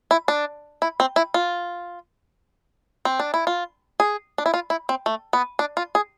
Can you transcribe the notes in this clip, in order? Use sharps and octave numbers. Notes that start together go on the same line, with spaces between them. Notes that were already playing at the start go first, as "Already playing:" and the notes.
E4
D4
E4
C4
E4
F4
C4
D4
E4
F4
G#4
D4
E4
F4
E4
C4
A3
B3
D4
F4
G#4